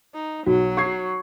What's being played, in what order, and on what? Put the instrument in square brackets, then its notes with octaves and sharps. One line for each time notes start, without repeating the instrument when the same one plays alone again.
[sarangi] D#4
[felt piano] B1 [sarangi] F#3 [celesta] F#4
[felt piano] C#6 G#6 C7